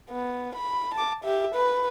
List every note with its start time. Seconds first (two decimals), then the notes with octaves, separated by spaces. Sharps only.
0.10 B3
0.55 B5
0.94 A5 D6
1.24 G4 E5
1.55 B4